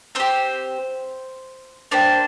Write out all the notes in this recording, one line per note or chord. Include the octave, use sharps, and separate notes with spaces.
C4 G4 C5
A#3 D4 G4 C5